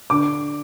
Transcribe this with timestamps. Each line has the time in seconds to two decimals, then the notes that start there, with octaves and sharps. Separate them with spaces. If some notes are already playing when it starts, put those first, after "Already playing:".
0.10 D3 D6